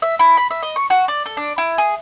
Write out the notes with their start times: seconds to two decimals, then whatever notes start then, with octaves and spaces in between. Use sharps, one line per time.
0.02 E5
0.19 E4
0.37 B5
0.51 E5
0.62 D#5
0.76 C#6
0.90 F#4
1.08 D5
1.26 A4
1.37 D4
1.58 E4
1.78 G#4